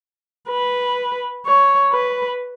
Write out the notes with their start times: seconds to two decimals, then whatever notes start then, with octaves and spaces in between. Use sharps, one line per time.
0.50 B4
1.46 C#5
1.93 B4